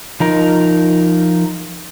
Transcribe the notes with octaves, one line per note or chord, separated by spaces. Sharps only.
F3 D#4 A#4